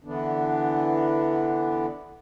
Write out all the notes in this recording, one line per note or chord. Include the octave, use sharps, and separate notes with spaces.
D3 E3 B3 D4